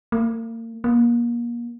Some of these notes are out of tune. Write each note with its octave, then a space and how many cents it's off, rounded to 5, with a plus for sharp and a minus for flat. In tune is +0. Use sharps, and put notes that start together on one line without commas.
A#3 -35
A#3 +30